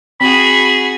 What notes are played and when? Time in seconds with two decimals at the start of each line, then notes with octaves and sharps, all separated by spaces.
0.21 C4 F#4 G#4 B5